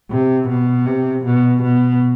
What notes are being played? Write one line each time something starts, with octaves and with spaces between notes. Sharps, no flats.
C3
B2
C3
B2
B2